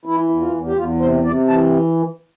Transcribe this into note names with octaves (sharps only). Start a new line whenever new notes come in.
E3 E4
E2
F4
E2
G4
E2 F4
C3 C5
C3 D5
E3 A5